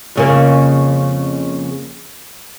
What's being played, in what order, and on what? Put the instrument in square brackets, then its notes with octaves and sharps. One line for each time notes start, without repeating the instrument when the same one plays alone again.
[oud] F2 C#3 A#3